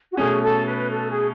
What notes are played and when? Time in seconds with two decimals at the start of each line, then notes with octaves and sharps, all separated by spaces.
0.12 F#4
0.17 B2 A3 C#4 G#4
0.42 A4
0.67 B4
0.91 A4
1.10 G#4